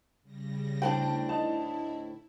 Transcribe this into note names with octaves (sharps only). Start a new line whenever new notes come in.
C#3 G3 A#6
D2 A2 D4 G5 A5
D#4 E4 A5